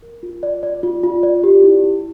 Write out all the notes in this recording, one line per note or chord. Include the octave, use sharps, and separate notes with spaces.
A#4
F4
D5
D5
F4
F4
D5
G4
E4
E4